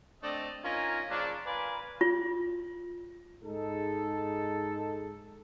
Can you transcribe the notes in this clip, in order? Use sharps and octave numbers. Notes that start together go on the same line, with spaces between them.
A3 C4 D4 D5 D#5
C#4 D#4 F4 A#4 G#5 A#5
A#2 C#3 F3 C#4 D4
F4 A#4 B4 D5 F5 G#5
F4
G#2 G#3 D#4 G#4 A4